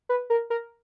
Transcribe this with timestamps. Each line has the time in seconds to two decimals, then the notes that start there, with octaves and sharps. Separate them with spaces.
0.09 B4
0.30 A#4
0.50 A#4